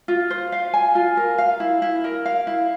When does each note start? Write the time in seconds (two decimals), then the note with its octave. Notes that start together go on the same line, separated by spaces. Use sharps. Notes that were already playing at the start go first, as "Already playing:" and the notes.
0.08 F4
0.30 C5
0.52 F5
0.74 G#5
0.95 F4
1.17 A#4
1.38 F5
1.60 E4
1.82 E4
2.04 A#4
2.25 F5
2.47 E4